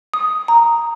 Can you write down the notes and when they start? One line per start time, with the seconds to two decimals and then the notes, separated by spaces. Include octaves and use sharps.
0.14 D#6
0.48 A#5